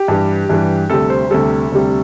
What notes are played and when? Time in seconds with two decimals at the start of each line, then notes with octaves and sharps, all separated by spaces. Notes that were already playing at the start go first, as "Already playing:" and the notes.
Already playing: G4
0.08 G2 E3 G3
0.49 G2 E3 G3
0.90 D2 C3 G3 A4
1.10 C5
1.30 D2 C3 G3 A4
1.72 D2 C3 G3